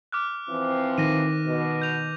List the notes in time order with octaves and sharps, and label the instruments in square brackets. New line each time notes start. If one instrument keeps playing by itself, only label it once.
[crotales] D6 F6 F#6
[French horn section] E3 F3 C4
[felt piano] D#3 [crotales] A#6 D#7
[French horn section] B2
[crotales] G6 F7